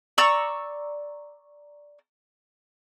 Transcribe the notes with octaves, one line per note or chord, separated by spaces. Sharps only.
D5 A#5 C#6 E6